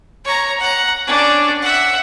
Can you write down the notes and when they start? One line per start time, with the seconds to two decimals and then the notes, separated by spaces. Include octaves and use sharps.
0.25 C#5 A#5
0.60 F#5 A#5
1.06 C#4 D4
1.62 E5 F#5